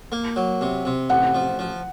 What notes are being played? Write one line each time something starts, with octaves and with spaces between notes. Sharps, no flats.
A#3
F#3
C3
C3
A1 F#5
F3
F3